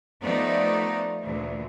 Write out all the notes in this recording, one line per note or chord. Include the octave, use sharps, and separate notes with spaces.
F3 A3 B3 D#4 D5
D2 A#2 E3